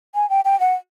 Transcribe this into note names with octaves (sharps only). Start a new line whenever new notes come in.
G#5
G5
G5
F#5